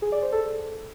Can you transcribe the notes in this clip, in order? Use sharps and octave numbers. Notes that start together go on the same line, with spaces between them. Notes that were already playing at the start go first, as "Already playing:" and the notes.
G#4
D5
C5
A4